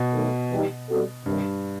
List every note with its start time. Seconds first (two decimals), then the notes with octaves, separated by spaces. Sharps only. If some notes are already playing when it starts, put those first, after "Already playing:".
Already playing: B2
0.13 D#3 F#3 A3 D#4 A4
0.51 E3 G3 D#4 G4
0.89 B2 G3 C4 F#4 A4
1.26 G2 C3 D#3 G3